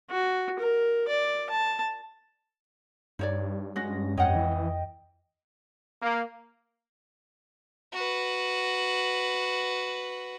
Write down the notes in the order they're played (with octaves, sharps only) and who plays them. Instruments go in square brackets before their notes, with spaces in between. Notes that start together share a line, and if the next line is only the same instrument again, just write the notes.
[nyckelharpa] F#4
A#4
D5
A5
[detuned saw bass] G2 [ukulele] D#4 C#5 D5
[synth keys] G#3 C#4 A#6 [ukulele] F#4
[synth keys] F2 D#5 G5 [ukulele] C#5 F#5
[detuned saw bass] E3
[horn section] A#3
[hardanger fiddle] F#4 B4